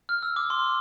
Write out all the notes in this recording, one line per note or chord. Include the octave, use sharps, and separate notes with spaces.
F6
E6
D6
C6